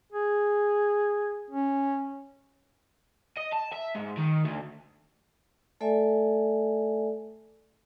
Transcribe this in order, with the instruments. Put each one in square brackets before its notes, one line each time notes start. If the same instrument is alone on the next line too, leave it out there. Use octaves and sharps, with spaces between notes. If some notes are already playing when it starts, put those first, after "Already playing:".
[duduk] G#4
C#4
[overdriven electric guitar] D#5
A5
E5
G#2
D#3
D2
[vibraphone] A3 A4 D5 E5 G#5